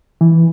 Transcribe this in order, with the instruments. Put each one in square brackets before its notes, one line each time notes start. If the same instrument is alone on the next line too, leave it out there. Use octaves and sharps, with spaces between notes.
[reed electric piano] E3